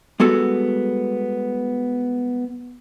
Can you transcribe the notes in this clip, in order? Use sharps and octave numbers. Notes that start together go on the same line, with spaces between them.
G3 G#3 B3 F#4 A4